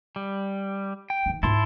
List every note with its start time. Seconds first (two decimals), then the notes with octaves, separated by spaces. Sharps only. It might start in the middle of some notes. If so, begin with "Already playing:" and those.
0.16 G3
1.10 G5
1.26 E3 D#4
1.43 G#2 E4 F4 A5 C6